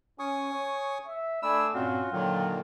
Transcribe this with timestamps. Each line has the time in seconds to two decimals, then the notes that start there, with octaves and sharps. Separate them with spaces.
0.19 C#4 G#5 C#6 D#6
0.54 C#5
1.07 E5
1.43 A3 D4 G#5 B5 E6
1.74 G2 A#2 C4 C#4 F4 F#4
2.13 A#2 D3 D#3 F#3 G5